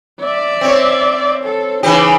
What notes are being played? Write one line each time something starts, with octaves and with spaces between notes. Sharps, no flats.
D5 E5
C4 C#5
A4
C#3 E3 D#4 G4 B5